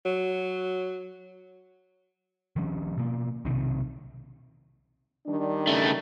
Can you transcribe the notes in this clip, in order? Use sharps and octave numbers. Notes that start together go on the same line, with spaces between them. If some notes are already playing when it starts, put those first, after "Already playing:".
F#3
D#3 F3 G3 C#4
B2 A#3
B1 C3 D#3
D#3 G3 D4
C#3 A3